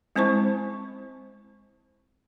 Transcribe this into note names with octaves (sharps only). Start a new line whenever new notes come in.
G#3 C4 E4 C5 A5 C#6